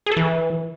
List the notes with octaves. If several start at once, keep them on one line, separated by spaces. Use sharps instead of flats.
G#4
A4
E3